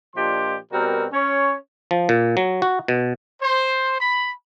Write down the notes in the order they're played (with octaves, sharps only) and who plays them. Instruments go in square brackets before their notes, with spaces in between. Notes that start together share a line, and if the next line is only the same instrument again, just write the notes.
[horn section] A#2 F3 D4 G4 D#5 C6
B2 G3 C4 F#4 A#4
C#4 C#5
[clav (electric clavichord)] F3
A#2
F#3
F#4
B2
[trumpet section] C5
B5